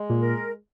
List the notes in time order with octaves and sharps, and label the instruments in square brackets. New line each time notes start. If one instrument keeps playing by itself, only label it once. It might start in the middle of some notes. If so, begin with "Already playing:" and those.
Already playing: [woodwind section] G#3
[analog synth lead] A#2
[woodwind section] A#4